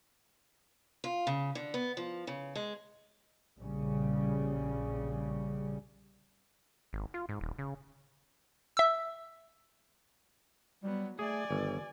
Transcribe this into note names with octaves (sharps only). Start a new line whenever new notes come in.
F4
C#3
D3
B3
F3
C#3
G#3
A#1 C#3 G3 C#4
G#1
F4
G#2
D#1
C#3
E5 E6
F#3 G3 B3
A3 G#4 D5 G#5
G1 D#3